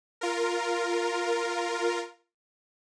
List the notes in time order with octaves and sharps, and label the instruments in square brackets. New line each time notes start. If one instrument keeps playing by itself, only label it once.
[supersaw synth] F4 A#4